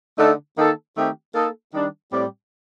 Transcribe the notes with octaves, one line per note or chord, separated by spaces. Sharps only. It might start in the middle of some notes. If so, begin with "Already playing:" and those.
D3 A3 D#4 A4
D#3 A#3 D#4 A4
D#3 A3 C4 G4
A#3 D#4 A4
D#3 G3 D4
A2 G3 C4 G4 D5